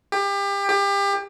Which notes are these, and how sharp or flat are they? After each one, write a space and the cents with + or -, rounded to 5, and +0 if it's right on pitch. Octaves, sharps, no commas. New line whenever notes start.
G4 +30
G4 +30